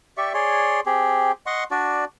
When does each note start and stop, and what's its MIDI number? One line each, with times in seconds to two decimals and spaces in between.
0.17 0.33 67
0.17 0.33 74
0.17 0.33 76
0.17 0.33 85
0.34 0.80 68
0.34 0.80 73
0.34 0.80 74
0.34 0.80 84
0.86 1.32 60
0.86 1.32 67
0.86 1.32 68
1.46 1.64 75
1.46 1.64 78
1.46 1.64 84
1.46 1.64 85
1.71 2.05 62
1.71 2.05 66
1.71 2.05 74